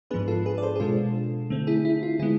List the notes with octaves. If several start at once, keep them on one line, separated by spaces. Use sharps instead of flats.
G#2 F3 B3 D4 G#4 B4
F4 A4
G#4 B4
D5
A4 C5
G#4
B2 G#3 D4 F4 A4
D3 A3 C4
E4 G#4
E4
F4
D3 G#3 B3 E4 G#4